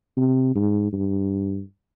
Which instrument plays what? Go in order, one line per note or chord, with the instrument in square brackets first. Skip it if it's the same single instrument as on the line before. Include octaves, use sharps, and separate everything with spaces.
[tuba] C3
G#2
G2